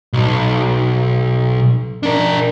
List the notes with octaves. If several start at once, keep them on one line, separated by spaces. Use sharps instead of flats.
B1
D4 A#4